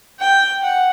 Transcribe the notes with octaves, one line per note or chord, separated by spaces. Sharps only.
G5
F#5